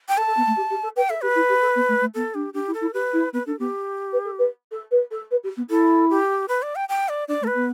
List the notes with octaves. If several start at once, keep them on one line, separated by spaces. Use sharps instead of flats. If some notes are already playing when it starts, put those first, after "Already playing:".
G5
A4 A5
A4
B3
A3
G4
G4
A4
B4 G5
A4 E5
G4 B4
E4
G4
A4
B3
A3
A3
B3 A4
D4 G4
D4 G4
E4
A4
E4
G4 B4
E4
B3 B4
D4 A4
B3 G4
B4
A4
B4
A4
B4
A4
B4
G4
B3
E4 A4
G4
B4
D5
G5
G5
D5
D4 D5
A3
A4
B4
B3